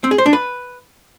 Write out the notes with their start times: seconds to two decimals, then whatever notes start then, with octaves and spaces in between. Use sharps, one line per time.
0.04 C4
0.11 G#4
0.18 C5
0.26 D4
0.33 B4